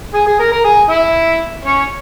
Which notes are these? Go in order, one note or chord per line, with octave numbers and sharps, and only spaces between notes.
G#4 G#5
G#4 G#5
A#4 A#5
A#4 A#5
G#4 G#5
E4 E5
C#4 C#5